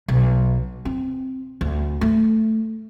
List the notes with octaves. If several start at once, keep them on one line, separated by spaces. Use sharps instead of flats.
B1
C4
D2
A3